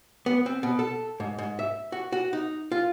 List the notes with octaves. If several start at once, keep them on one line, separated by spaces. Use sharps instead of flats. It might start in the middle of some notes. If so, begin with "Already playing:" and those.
B3
C4
B2
A4
G#2
G#2
E5
F#4
F#4
D#4
F4